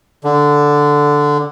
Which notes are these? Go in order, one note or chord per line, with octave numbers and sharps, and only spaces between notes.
D3